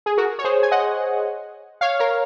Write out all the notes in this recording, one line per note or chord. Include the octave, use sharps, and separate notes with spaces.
G#4
F#4 A#4
C#5
G#4 C5
G#5
D#5 F#5
C#5 F5
A#4 C#5